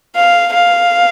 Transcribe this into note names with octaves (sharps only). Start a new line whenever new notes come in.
F5
F5